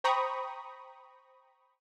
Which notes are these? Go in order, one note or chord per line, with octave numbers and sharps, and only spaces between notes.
C5 G5 A#5 B5 C#6 D#6